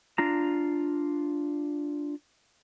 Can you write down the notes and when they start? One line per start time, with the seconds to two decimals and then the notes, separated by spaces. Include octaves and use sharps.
0.18 D4 F4 A#5